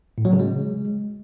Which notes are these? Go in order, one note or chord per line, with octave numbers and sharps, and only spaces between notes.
A2
F#3
C#3
G#3